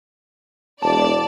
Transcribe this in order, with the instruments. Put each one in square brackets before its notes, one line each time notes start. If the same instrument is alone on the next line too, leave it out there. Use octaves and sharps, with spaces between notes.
[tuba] E1 [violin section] D5 [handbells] A5